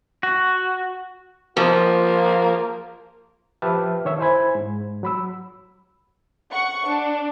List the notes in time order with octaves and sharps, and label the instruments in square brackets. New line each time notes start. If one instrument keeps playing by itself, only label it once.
[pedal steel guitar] F#4
[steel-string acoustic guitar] F3 [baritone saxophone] A#3 [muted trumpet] F4
[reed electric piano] F3 G4 B4 E5 A5 F6
D#3 C#5 E5
E4 C5 G#5 B5 G#6
G#2
F#3 B5 E6
[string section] F#5 C#6
D4